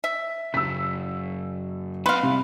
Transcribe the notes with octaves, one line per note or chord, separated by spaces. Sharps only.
E5
F#2 C#3 E6 B6
B3 C4 B4 F5 C6
C2 C3